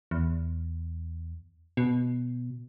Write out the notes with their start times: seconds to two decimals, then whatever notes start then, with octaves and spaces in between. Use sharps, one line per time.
0.11 E2
1.77 B2